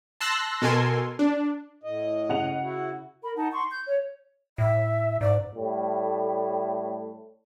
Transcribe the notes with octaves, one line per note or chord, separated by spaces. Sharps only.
A5 C6 E6 F#6 A#6
B2 A4 A#4 G#5 C6
D4
A2 D#5
C#3 F#5 F7
E4 F#4
A#4 B5
D#4 F#5 A5
C6 C#6
G6
C#5
A2 E5
G#2 D5
A2 G3 A3